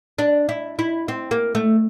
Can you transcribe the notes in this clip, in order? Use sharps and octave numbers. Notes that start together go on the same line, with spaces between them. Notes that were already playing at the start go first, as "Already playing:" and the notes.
D4
E4
E4
C4
A#3
A3